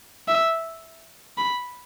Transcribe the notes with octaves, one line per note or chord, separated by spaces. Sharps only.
E5
B5